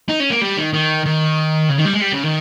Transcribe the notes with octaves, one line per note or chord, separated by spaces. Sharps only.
D#4
C#4
A#3
G3
D#3
D#3
D#3
C#3
D#3
G3
G#3
G3
C#3
D#3